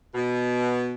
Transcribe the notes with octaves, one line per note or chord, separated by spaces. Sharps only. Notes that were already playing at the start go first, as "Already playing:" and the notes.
B2